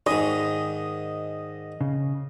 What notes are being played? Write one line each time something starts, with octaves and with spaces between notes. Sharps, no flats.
G#2 D#3 D#5 G#5
C#3